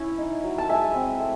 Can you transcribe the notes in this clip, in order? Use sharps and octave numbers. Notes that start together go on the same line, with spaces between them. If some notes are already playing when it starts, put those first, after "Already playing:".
Already playing: C#4 E4
D#4
F#3
A5
G#3 E5 G#5
C4
A3